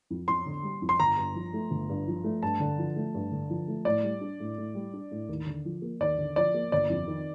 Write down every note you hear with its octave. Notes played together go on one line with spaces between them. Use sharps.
F2
F2 C6
D3
G3
F2
C6
G1 A#5
G2
F3
A3
G1
G2
F3
A3
G2 A5
D3
F3
A3
G2
D3
F3
A3
A2 D5
G3
D4
A2
A2
G3
D4
A2
D#2
D3
F3
A#3
D#2 D5
D3
F3 D5
A#3
G1 D5
F2
D#3